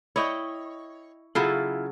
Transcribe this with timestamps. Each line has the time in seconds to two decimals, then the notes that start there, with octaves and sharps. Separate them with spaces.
0.16 E4 C#5 D#5 G5
1.35 C#3 F#3 E4 F4 A4